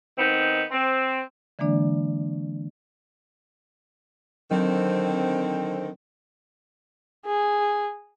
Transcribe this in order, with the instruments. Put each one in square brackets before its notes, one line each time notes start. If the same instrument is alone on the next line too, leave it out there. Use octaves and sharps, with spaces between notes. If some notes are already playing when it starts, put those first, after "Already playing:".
[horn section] D#3 B3 C4 D#4
C4
[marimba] D3 E3 G#3 A#3 D4 D5
[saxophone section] D3 D#3 C4 [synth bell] F#3
[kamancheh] G#4